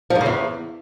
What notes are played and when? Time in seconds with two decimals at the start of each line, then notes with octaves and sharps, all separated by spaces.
0.10 F3
0.15 G#2
0.21 C#3
0.26 E2